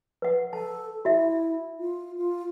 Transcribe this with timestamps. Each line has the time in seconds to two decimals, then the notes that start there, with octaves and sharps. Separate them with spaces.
0.22 B4 F#5
0.53 A4 A5
1.05 E4 F#4 E5
1.79 F4
2.17 F4